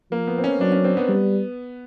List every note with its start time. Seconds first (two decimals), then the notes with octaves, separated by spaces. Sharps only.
0.11 F3 A#3
0.27 B3
0.38 C4
0.44 C#4
0.60 F#3 D4
0.72 C#4
0.85 C4
0.97 B3
1.09 G3